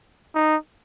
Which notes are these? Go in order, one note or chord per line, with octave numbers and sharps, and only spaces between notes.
D#4